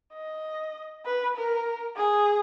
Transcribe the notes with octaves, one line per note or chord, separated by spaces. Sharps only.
D#5
B4
A#4
G#4